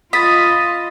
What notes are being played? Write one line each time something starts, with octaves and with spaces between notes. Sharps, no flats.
F4 D#5 B5 D#6 A6